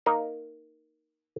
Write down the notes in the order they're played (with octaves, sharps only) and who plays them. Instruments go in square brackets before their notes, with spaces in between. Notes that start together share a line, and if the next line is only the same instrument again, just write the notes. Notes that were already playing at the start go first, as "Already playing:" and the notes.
[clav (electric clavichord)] A#3 D#4 A#4 F5